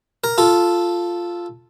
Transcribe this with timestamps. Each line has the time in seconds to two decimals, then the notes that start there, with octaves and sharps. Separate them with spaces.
0.24 A#4
0.38 F4 A4